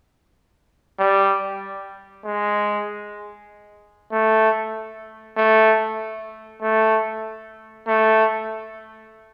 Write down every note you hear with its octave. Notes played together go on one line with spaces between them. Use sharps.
G3
G#3
A3
A3
A3
A3